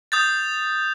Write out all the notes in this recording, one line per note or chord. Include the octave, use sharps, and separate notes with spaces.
D#6 G6 A6